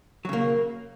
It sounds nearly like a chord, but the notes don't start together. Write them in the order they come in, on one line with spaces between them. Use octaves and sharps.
F#3 C#3 A#3